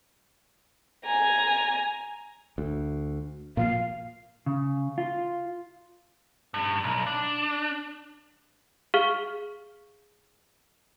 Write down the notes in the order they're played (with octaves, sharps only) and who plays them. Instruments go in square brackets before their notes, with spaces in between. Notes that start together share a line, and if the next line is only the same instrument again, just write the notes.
[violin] G#5 A#5
[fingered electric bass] D2
[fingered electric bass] A#2 F3 A#3 [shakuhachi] F5
[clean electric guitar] C#3
F4
[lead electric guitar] G2
B1
D4
[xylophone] G#4 F5 C#6 F6 G7